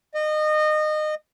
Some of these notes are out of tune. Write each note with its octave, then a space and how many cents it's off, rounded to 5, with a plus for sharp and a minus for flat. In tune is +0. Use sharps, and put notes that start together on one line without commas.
D#5 -25